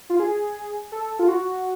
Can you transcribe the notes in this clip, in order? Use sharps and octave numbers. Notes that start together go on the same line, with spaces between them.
F4
G#4
A4
F4
F#4